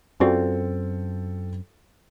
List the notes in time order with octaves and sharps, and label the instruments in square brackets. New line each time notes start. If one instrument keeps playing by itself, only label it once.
[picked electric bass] F#2 C4 [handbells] C#4 F#4 D5 [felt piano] F4 A4 G5